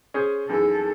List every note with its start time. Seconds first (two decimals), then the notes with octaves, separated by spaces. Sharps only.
0.14 C#4 G#4 C5
0.49 F#2 E3 D#4 E4 G#4 A4